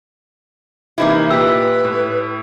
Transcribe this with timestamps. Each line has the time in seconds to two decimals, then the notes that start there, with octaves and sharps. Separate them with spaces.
0.98 C3 E3 A#3 D#4 E4
1.30 A#2 G4 B4 E6 B6
1.85 A2